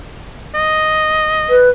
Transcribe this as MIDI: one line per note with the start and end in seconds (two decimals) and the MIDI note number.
0.54 1.66 75
1.50 1.70 71